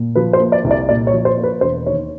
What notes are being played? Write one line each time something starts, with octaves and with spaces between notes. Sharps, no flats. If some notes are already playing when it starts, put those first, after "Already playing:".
Already playing: A#2
F3 B4
C5
A#3
D5
C2
D5
A#2 D5
C#5
F3
C5
A#3
B4
E1 C5
D#2 C#5